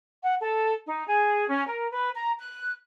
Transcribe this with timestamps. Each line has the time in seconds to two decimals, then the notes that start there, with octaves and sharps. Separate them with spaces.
0.23 F#5
0.41 A4
0.86 D#4
1.08 G#4
1.49 C#4
1.67 A#4
1.92 B4
2.15 A#5
2.38 F#6